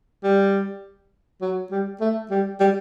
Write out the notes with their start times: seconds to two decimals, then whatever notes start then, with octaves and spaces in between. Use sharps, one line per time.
0.24 G3
1.42 F#3
1.71 G3
2.01 A3
2.30 G3
2.60 G3